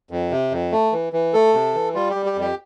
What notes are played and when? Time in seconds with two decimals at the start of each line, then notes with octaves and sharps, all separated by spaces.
0.11 F2
0.31 C3
0.52 F2
0.72 A3
0.93 E3
1.13 E3
1.34 A3 A4
1.54 C3
1.74 E3
1.94 G3 F4
2.10 G4
2.15 G3
2.26 G4
2.36 F2
2.41 G4